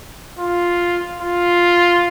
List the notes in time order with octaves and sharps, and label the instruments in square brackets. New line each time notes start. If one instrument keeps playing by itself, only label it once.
[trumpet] F4
F4